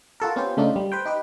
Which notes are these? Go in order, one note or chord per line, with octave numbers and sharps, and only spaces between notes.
F4 F#4 A4 A#4
B3 C#4 F4 G4 C5
C#3 A3 D4 D#4 F4
G3
B4 C5 G5
D#4 G4 B4